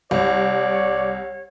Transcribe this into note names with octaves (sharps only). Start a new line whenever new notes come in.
C2 C#5 D5